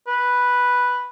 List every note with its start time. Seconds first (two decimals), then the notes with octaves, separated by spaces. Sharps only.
0.07 B4